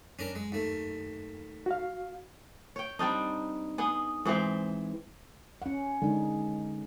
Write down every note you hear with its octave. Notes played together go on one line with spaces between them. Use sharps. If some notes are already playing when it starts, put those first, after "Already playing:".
F#2 C#4 D4 A#4
G#3
D#2 A3
F#4 F5
C#5 G5
G3 C4 D4 D#4
B3 G#4
G#2 E3 C4 C5
C#4 F#5
D3 G#3 D#4